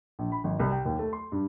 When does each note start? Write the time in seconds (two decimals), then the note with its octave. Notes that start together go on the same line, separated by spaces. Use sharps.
0.19 A#1
0.32 B5
0.44 G#1
0.60 C2
0.71 G5
0.85 D#2
0.99 A3
1.13 C6
1.32 G2